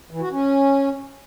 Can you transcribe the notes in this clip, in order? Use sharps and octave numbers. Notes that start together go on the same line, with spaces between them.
E3
F#4
C#4